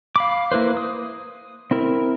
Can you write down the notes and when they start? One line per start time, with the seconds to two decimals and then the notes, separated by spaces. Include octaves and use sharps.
0.16 F5 B5 D6
0.52 A#3 E4 B4 C5
0.77 D#6
1.71 C4 E4 A#4